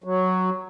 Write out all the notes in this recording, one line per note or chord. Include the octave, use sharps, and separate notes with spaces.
F#3